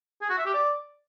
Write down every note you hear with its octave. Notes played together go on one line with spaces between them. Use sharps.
G#4
F#4
E5
G4
D5